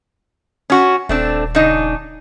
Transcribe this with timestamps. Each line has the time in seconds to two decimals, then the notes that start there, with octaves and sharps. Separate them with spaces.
0.70 C#4 F#4
1.09 D#1 A3 C4 D4
1.55 C#3 D4 D#4